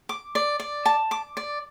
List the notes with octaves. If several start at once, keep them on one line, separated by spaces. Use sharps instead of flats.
D6
D5
D5
A5
D6
D5